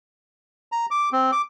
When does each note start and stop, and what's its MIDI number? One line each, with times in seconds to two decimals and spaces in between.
0.72 0.86 82
0.91 1.09 86
1.12 1.31 60
1.32 1.42 86